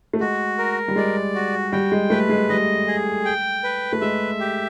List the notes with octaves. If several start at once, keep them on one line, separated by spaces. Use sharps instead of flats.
A3
G#3 F#4
A#4
G3
G#3 D5
F#4
G3 G5
G#3
A3 B4
G#3
G3 D#5
G#4
G5
B4
A3
G#3 E5
G4